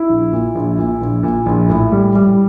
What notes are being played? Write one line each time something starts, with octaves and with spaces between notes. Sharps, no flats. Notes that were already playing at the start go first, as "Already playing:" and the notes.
Already playing: E4
A#1
A#2
A#1
A#2
A#1
A#2
A#1
A2
G3
G3